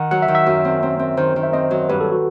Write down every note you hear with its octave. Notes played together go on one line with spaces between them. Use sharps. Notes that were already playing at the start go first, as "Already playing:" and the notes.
Already playing: D#3 F#5
F#3 F#5
E5
D#3
E5
F#2
C4
C4
C4
D#3 C5
D#3
E5
C4 D#5
F#3
G2 B4
A4
F#4